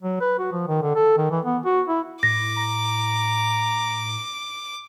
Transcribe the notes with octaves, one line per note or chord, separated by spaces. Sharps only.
F#3
B4
F#4
F3
D#3
D3
A4
D#3
E3
B3
F#4
E4
A2 D6 A#6
A#5